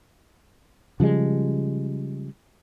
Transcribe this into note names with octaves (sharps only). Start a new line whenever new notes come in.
C#3 F3 G3 G#3